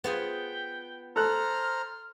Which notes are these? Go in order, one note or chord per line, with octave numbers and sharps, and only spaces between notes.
B3 F4 G#4 G5
A4 C5 A#5 F6 F#6